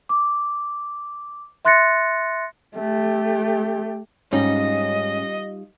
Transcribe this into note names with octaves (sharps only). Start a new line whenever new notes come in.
D6
E5 C6 F#6 A6 A#6 C#7
A3 G4
G#2 G3 C4 C#4 D#4 F4 D#5